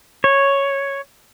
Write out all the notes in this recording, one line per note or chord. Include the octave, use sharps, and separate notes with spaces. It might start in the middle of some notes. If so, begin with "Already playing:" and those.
C#5